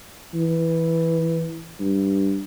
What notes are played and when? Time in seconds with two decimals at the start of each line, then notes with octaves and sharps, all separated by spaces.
0.34 E3
1.80 G2